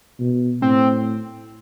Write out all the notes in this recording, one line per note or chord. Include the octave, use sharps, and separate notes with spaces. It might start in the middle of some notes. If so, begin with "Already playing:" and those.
B2
A2 C4